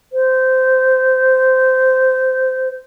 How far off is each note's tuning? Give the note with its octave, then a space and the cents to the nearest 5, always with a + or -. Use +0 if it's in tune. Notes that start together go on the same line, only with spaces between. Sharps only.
C5 -15